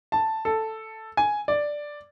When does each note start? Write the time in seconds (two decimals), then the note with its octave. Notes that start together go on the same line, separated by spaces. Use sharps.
0.12 A5
0.45 A4
1.17 G#5
1.48 D5